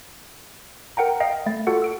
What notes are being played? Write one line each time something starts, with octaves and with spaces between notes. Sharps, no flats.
A#4 F#5 G5 A#5
D#5 F5 G5
A3 A6
F4 F#4 A4 F#5
E6 D7